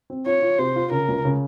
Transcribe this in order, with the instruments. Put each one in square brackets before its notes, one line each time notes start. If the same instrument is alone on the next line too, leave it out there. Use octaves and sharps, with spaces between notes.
[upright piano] C4
[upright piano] F4 [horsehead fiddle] C#5
[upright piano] F4
[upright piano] C3 [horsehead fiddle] C5
[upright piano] F4
[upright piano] C#3 [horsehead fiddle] A#4
[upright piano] C#2
C#3